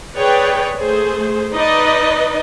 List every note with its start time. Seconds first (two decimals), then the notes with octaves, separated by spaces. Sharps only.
0.16 G#4 B4 C#5 D5 G5
0.79 A3 G#4 C5
1.54 D#4 B4 D5 D#5